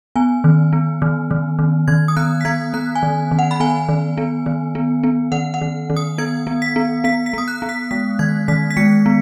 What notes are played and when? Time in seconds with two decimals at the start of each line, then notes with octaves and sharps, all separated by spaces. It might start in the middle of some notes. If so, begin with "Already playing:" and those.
0.16 B3 G#5
0.44 D#3
0.73 B3
1.02 D#3
1.31 D#3
1.59 D#3
1.88 D#3 G#6
2.08 D#6
2.17 B3 F#6
2.41 B6
2.45 B3 G#6
2.74 B3 F#6
2.95 G#5
3.03 D#3
3.31 D#3
3.39 F#5
3.51 B5
3.60 B3 G#5
3.89 D#3
4.18 B3
4.46 D#3
4.75 B3
5.04 B3
5.32 D#3 F#5
5.54 F#5
5.62 D#3
5.90 D#3
5.96 D#6
6.18 B3 G#6
6.47 B3
6.62 B6
6.76 B3
7.04 B3 B6
7.26 B6
7.33 B3 D#6
7.48 F#6
7.62 B3
7.69 B6
7.91 G#3 B6
8.19 D#3 G#6
8.48 D#3 B6
8.71 B6
8.77 G#3 C#7
9.06 B3